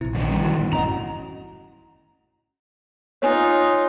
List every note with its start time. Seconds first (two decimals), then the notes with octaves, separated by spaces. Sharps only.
0.01 A#1 C3 E4
0.15 F#2 D3 D#3
0.30 F3 G3 C#4
0.41 E4 F#4
0.59 A1 B2
0.73 G1 E2 A2 C#4 D#5 F#5 A#5
3.22 D#4 F4 C#5 G#5 F#6